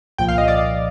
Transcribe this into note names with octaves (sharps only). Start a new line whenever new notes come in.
C2 A#2 F3 G5
F5
D#5
D5